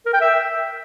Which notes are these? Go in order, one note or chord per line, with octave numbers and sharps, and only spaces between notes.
A#4
G5
E5